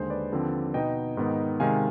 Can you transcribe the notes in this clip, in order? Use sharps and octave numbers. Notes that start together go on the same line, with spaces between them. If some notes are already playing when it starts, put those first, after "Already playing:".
Already playing: D#2 D3 G#3 G#4 C5
B4 D5
D#2 D3 F3 C4
B2 B3 D#4 D#5 G5
G#2 D#3 B3 D#4
C3 D#3 G#3 F5 G#5